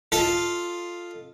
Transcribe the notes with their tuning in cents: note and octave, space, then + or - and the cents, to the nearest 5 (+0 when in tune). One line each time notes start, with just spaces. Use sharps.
F4 +0 A4 +0 D#5 +0